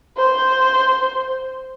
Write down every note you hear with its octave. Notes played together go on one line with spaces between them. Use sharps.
C5